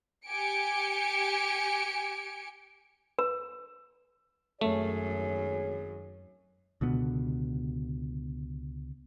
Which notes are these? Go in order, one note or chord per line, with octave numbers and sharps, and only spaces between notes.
G4 G#5 C#7 D7
B4
G#1 F#2 A3 G#4 C#5
C#2 B2 D3 B3